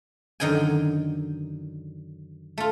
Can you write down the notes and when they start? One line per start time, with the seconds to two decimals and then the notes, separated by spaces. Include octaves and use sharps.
0.40 F#2 D3 D#3 G5 G#5
2.58 A3 F4